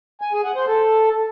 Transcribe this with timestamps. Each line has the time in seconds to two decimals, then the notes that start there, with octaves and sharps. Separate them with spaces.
0.21 G#5
0.33 G#4
0.44 F#5
0.55 C5
0.67 A4